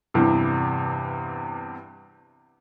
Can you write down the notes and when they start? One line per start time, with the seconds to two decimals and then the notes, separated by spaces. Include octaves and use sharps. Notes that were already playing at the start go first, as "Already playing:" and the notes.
0.14 E2 G2 C3 E3